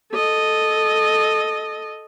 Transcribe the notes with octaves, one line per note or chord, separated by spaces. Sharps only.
A4 D#5